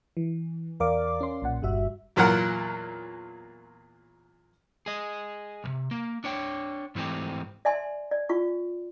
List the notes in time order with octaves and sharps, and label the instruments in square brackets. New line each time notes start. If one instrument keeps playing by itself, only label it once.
[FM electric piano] E3
E2 A#4 D5 F5 D6
C#4 C6
B1 A#2 F#5
G1 G2 G3 F#4 E5
[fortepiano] E2 A#2 F#3 F4 A#4 F#5
[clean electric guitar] G#4 D#5
B1 C3
A#3
D4 C#5 G5
G#2 E3 A3 C4 D#4 G4
[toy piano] D5 E5 G#5 C6
D5
F4 C#6